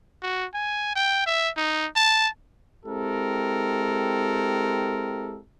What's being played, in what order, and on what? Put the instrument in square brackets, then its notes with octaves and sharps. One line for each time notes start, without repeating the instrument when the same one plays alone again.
[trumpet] F#4
G#5
G5
E5
D#4
A5
[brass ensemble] G#3 C4 E4 G4 A4 A#4